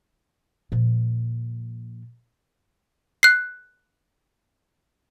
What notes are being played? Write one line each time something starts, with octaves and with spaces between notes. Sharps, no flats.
A#2 F3
F#6 C7